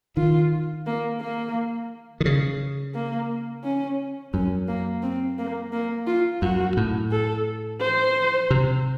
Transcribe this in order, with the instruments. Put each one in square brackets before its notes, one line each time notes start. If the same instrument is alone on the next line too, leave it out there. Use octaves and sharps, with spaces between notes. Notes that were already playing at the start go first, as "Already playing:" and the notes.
[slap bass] D#3 [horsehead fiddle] F4
[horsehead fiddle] A#3
A#3
[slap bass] D#3
C#3
[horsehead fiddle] A#3
C#4
[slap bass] F#2 [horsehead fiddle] C#4
[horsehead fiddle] A#3
C4
A#3
A#3
F4
[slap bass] F#2 [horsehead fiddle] F#4
[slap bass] A2
[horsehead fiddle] A4
C5
[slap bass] C3